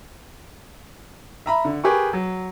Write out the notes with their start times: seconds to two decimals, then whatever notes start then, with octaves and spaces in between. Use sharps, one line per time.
1.46 E5 A#5 B5
1.65 D3
1.84 G4 G#4 A#4 B4 C#6
2.13 F#3